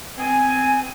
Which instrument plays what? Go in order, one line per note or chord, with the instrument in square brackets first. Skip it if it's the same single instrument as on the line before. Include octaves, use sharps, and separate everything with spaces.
[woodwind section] B3 C4 G#5